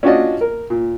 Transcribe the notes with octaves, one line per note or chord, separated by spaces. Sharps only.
C#4 D4 F4 F#4 D5 D#5
A#4
A#2